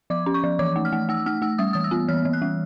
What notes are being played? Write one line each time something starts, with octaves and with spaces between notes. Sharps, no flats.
F3 D6
C#4
C#6
F3
E3 D6
A3
F6
A3
A3 E6
A3 F6
A3 E6
G3 D#6
E3 D#6
E6
B3
E3 F6
E3
F#6
G3